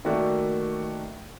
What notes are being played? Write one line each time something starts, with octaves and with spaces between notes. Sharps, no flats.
D#3 A3 A#3 F#4 D5